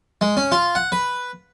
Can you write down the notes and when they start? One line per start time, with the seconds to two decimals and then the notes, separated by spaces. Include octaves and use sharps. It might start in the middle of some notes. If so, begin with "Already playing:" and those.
0.21 G#3
0.37 C#4
0.52 F4
0.75 F#5
0.92 B4